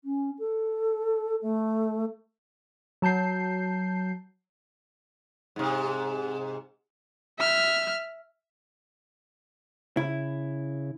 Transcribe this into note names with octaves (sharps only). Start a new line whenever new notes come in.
C#4
A4
A3
F#3 A5 G6 C7
G#2 C3
E5 F6
C#3 E4